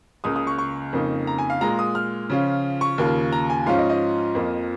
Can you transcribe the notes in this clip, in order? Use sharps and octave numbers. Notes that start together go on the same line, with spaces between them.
C#2 C#3 A#3 D#6
D#6
C#6
C#6
F2 C#3 A#3 D#4
A#5
G#5
F5
A#2 G#3 F4 A#5
D#6
F6
C#3 F3 C#4 F4
C#6
D#2 C#3 A#3 F4
A#5
G#5
G#2 F3 C#4 F4 F5
D#5
D#5
F2 F3 A#3